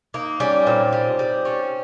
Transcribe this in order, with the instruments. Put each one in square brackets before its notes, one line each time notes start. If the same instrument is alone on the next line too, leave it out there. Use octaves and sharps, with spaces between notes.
[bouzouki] A#3 [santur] D#4
[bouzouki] G3 [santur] C#4
[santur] C#4
[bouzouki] A#2 [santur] C4
[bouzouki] G3
G3
C#4